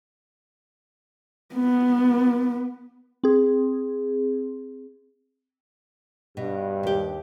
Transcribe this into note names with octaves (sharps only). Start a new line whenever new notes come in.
B3
C4 G#4
G2 B2
D#2 G4